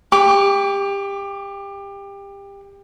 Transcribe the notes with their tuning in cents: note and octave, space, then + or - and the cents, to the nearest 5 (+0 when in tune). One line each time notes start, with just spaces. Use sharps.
G4 +25 D6 -25